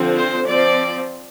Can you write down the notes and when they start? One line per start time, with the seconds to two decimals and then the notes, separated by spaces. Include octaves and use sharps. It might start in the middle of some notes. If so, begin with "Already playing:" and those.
Already playing: D3 F3 C4
0.18 C5
0.48 F3 C4 D5